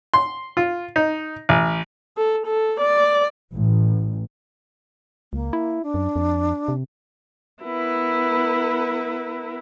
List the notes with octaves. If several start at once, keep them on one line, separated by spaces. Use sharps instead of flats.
C6
F4
D#4
A1
A4
A4
D5
A1
C#2 A#3
E4
D4
F#2
F2
C3
B3 E4 A#4 B4